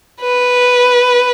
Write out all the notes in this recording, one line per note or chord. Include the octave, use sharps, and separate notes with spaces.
B4